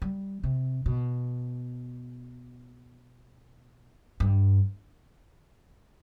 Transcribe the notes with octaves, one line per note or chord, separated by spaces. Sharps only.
G3
C3
B2
G2